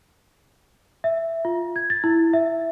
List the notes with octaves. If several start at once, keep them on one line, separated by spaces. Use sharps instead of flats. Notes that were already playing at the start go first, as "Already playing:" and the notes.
E5
F4
G#6
A6
E4
E5